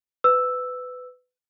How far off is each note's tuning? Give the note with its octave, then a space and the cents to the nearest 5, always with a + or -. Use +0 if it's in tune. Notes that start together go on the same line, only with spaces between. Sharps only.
B4 +20 E6 +0